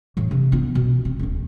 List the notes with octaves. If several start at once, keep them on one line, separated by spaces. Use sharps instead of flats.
A2 E3
C3
B3 F4
B2
C4
D#1 D#3